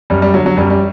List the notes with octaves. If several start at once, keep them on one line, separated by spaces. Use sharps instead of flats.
F#2 G3
G3
D3 F#3
F#3
F#2 G3
G3